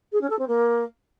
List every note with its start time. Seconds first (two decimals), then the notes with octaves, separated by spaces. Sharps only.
0.12 G#4
0.21 C#4
0.30 A4
0.39 C4
0.48 A#3